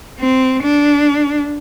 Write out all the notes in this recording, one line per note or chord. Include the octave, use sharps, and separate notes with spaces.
C4
D4